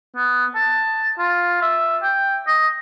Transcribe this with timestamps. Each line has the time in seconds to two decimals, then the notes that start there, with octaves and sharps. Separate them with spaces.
0.16 B3
0.55 A5
1.19 F4
1.62 E5
2.03 G5
2.47 D#5